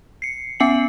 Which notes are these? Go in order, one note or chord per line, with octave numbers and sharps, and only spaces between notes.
C7 C#7
B3 C#4 G#5 C7 C#7 F#7